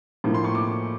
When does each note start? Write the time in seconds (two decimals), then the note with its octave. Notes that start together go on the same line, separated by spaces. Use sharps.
0.24 A2 F3 A#3
0.34 C6
0.44 C#6
0.55 D6